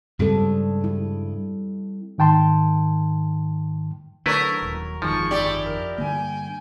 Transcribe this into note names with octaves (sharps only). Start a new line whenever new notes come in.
G2 C#3 G3 G#3 C4 A4
E4
G#2 D#3 G5 A5 C6
D3 F#3 A3 E4 A#4 B4 C#5
D#1
G1 F2 D#3 F3 G#3 C#6
E4 G4 D5
A#4
G2 D3 A#3 G5 G#5